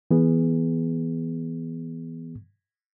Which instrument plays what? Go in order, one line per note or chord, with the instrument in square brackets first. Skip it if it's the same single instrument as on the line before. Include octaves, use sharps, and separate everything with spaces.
[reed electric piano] E3 B3 G#4